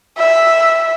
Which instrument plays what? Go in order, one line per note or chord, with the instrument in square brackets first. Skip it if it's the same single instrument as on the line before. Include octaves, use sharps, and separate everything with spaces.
[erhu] E5